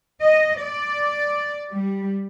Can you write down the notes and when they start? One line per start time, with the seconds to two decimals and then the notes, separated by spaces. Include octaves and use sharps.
0.21 D#5
0.59 D5
1.71 G3